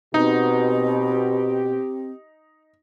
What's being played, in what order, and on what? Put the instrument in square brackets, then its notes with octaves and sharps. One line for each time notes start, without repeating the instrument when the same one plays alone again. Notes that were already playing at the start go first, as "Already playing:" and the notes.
[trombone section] B2 [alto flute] C4 [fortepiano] D#4 [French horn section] G4